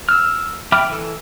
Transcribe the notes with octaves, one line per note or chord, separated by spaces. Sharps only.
E6 F6
E5 G5 B5 D6 F6
E3 A4